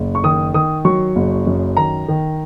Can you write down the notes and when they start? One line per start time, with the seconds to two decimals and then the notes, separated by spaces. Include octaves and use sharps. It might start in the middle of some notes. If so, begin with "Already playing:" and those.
Already playing: F#1
0.15 C#6
0.24 D#3 D#6
0.54 D#3 D#6
0.85 F#3 C#6
1.16 F#1
1.47 F#2
1.77 D#3 A#5
2.08 D#3